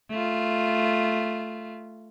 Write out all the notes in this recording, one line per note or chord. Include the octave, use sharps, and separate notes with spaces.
A3 F4